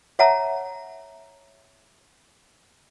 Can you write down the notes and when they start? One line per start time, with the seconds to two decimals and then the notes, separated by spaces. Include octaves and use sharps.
0.19 C#5 E5 F#5 A5 A#5